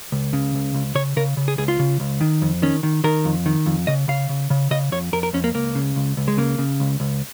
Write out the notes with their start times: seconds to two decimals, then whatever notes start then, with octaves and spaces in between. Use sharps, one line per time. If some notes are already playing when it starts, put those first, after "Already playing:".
0.12 C#2
0.33 C#3
0.54 C#2
0.74 C#2
0.95 C#3 C#5
1.16 C#3 A#4
1.37 C#3
1.48 G#4
1.58 C#2 G#4
1.68 F4
1.79 C#3
2.00 C#2
2.21 D#3
2.42 F2
2.62 D#3 C#4
2.83 D#3
3.04 D#3 A#4
3.25 F2
3.46 D#3
3.66 F2
3.87 C#3 D#5
4.08 C#3 F5
4.29 C#3
4.50 C#3
4.71 C#3 D#5
4.92 F2 C#5
5.13 F2 A#4
5.23 A#4
5.33 F2 C#4
5.44 A#3
5.54 C#2 A#3
5.75 C#3
5.96 C#2
6.17 C#2
6.28 G#3
6.37 C#3 A#3
6.58 C#3
6.80 C#2
7.00 C#2